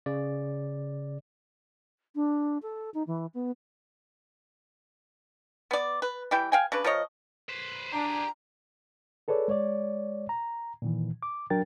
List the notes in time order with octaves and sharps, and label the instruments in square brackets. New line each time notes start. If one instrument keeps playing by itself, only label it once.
[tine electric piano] C#3 D5
[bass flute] D4
A4
D#4
E3
B3
[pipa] B3 D5
B4
E3 G3 E4 G5
F5 G5 G#5
C#3 D4 B4
F3 A#4 C#5 D#5
[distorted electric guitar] B4 C5
[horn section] D4 [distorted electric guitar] G4 G#4 [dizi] A#5
[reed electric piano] G#4 A4 B4 C#5 D5
G#3 C#5 D5
A#5
A#2 D#3 E3
D6
F#3 D4 A#4 G5 A6